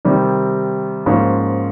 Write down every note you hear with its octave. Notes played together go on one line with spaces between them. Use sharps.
C3 D#3 G3
G#2 F3 A#3 C#4